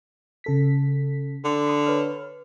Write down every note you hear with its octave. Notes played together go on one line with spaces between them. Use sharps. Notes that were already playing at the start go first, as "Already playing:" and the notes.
C#3 A4 B6
D3
B5 C6 D#6
B4 C#5 F6